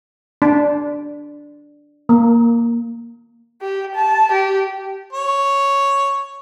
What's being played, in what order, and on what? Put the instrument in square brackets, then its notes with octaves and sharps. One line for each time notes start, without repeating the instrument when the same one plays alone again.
[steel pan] D4
A#3
[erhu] G4
A5
G4
[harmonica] C#5